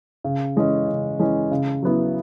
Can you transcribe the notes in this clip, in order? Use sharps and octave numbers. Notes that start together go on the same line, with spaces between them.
C#3
E3 G#3 C#4
C#3
E3 G#3 C#4
C#3
F#3 B3 E4